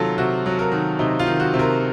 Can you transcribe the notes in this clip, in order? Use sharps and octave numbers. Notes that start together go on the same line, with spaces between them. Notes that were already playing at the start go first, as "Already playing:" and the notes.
Already playing: C3 D#3 F#3 F4 A4
C3 F#4
F#3
A#4
D#3
C3 D#4
F4
D#3
F#4
C3
A#4